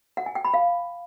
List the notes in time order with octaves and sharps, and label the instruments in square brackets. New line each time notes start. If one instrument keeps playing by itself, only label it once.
[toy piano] F#5
G#5
G5
B5
F5